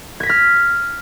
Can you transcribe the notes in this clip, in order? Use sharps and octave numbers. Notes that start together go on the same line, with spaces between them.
F6 G#6 A#6 B6